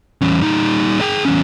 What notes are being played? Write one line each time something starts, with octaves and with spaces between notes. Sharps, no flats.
E2 C#4
G3 D#4
G#4 G5
E2 C#4